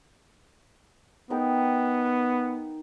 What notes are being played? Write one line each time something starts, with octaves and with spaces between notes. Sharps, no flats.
B3 D#4 A#4 G5